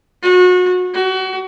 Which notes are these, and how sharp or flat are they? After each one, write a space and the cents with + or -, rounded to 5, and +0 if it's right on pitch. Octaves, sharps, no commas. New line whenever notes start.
F#4 -30
F#4 +30